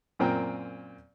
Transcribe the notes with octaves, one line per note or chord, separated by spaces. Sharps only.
F#2 A#2 C4 A#4 G5